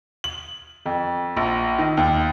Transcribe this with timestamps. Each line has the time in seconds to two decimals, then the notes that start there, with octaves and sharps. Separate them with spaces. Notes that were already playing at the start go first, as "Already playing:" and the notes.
0.24 F#7
0.86 F2
1.37 A#1
1.79 D#3
1.97 D#2